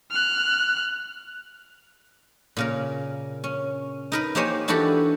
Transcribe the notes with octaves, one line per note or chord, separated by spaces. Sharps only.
F6 F#6
A#2 C#3 A#4
C#4
D#4 A#4 B4
A#3 D#4 G4 C5 C#5 G#5
E3 D4 E4 F#4 G4 A4